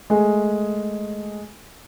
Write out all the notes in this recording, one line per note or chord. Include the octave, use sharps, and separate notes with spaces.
G#3 A3 G#4